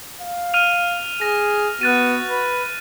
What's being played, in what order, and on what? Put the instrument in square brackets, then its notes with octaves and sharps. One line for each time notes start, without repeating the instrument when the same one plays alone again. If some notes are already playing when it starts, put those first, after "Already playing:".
[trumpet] F5
[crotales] F6 D#7 F7
[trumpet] G#4 [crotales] A#6
[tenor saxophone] B3 [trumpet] F#4 [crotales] F#6 A6 D#7
[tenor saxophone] B4